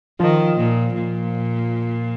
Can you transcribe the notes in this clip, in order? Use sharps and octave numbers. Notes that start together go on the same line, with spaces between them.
D#3 F3 F4
A#2
A#2